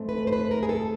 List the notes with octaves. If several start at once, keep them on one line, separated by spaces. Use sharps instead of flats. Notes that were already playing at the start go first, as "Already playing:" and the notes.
Already playing: G#2 E3 A3 C4
B4
C5
B4
A#4
G#4
A4